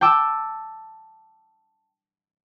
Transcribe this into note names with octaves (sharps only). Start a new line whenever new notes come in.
G5 A5 D6 E6